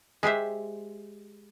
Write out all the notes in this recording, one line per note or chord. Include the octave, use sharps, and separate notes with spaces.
G#3 G4 C5 E5